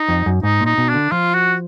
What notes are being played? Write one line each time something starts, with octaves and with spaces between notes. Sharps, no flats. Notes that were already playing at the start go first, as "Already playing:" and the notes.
Already playing: D#4
F2
F#2
G#2 D#4
A#2
D#4
B2
D4
D3
F3 F4
F#4